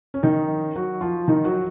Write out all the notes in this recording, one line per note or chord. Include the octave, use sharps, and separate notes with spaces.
C#4
D#3 D#4
F#3 F#4
F3 F4
D#3 D#4
F#3 F#4